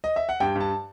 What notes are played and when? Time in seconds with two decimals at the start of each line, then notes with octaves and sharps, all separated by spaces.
0.04 D#5
0.16 E5
0.29 F#5
0.40 G2 G5
0.55 G2
0.60 A5